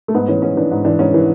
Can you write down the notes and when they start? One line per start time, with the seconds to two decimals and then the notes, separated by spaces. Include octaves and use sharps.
0.08 A3
0.14 G#2 B3
0.28 E3 C#4
0.42 G#2 C#4
0.57 E3 D4
0.71 G#2
0.85 E3 D4
0.99 G#2 C#4
1.14 E3